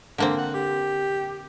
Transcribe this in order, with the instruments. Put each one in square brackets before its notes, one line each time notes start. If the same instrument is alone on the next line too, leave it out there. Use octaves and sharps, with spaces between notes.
[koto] D3 A#3 C4
[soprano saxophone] F#5
G4